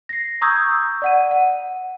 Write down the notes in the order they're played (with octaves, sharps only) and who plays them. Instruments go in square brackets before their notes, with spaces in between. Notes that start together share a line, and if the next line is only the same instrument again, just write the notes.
[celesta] A#6 C7
A#5 C#6 D#6 E6 G6 G#6
D5 F#5 D#7
F#5